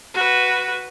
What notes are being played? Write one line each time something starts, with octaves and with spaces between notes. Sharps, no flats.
F#4 B4